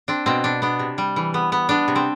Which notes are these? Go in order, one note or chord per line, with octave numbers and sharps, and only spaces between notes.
C4 D4
B2 C4
B2 D4
B3 D4
C3
G3
E3
B3
B3
B3 D4
C3
C4